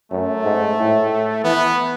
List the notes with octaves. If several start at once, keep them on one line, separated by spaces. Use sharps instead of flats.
F#2 A3
G#2
A2
E3 B3